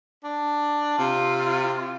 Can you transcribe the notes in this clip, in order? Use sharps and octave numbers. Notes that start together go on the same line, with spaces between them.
D4
C3 F4